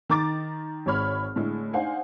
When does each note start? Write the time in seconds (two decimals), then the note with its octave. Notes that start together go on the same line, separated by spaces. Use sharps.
0.09 D#3 A#5 D6 A6
0.86 G#1 G#3 C#5 B5 F6
1.36 A2 D3 G#3 A3
1.73 D4 D#4 C5 F5 F#5 G#5